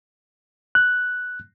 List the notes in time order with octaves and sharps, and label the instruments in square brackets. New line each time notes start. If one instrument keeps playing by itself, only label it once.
[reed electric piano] F#6